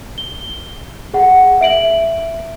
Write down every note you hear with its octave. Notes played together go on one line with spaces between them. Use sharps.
G7
G#4 F#5
E5 D7 F#7